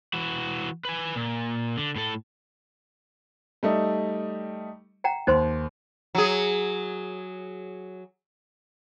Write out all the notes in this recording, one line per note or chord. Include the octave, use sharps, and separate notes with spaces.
E3 F#4
B4 G#5
A#2
D3
A2 A4
G3 A3 D#4
F#5 G5 A#5
D#2 D#4 C5 C6
F#3 G#4